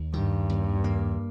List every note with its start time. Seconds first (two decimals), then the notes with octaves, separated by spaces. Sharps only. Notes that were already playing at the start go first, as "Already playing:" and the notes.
Already playing: D#2
0.14 G2 D#3
0.50 D#2
0.84 A#3